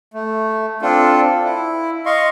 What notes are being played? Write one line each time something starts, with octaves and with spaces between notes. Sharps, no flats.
A3
C4 D4 F4 A4
E4
D#5 F5 C6 C#6